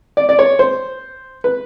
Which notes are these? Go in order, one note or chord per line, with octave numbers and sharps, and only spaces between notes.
D5
D5
C#5
C5
B4